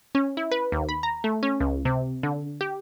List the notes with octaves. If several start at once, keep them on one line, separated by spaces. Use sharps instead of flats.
C#4
E4
B4
D#2
B5
A#5
A3
C#4
C#2
C3
D3
G4